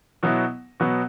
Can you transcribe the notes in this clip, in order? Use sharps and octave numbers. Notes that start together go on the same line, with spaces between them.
B2 F#3 B3 E4
B2 F#3 B3